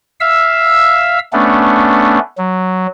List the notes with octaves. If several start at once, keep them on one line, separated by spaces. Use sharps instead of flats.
E5 F5 E6
A3 B3 C#4 D4
F#3